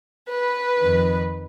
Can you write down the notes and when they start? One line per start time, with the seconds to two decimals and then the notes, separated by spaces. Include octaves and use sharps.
0.30 B4
0.79 F2 D#3